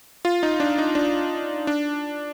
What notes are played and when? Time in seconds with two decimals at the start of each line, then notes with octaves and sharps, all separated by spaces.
0.25 F4
0.43 D#4
0.60 D4
0.78 D#4
0.95 D4
1.67 D4